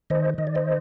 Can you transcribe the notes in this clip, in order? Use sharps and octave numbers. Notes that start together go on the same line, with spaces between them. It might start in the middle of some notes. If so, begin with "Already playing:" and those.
D#3 C5 D#5
D#3 D#5
D5
C5 D#5